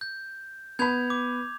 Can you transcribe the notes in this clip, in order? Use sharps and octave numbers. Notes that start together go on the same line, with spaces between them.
G6
B3 B5 G6 G#6 F7
D6